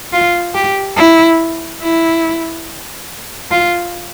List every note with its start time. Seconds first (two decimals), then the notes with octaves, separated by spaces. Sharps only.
0.13 F4
0.55 G4
0.97 E4
1.82 E4
3.51 F4